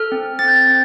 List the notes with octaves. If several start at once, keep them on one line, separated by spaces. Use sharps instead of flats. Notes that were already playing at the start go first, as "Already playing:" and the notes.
Already playing: A4 F6
C4
C4 A6
G6
A6
C4